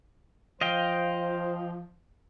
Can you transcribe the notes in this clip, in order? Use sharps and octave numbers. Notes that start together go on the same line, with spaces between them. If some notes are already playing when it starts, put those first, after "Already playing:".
F3 C5 D#5 F5 G5